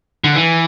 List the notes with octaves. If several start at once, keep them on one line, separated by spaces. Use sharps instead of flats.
D3
E3